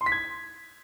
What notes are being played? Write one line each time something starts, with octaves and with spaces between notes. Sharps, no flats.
C6
B6
G#6